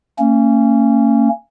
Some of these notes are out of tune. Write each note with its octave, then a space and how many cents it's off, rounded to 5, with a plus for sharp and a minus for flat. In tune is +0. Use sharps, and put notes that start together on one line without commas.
A#3 -40 C#4 -10